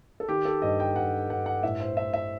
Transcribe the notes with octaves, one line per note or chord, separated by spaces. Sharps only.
A4
D#3 G4
A4
G2 D#5
G5
G2 F#5
G2 F#5
F#5
A2 E5
C5
A2 E5
E5